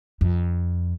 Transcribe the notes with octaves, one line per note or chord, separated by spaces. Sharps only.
F2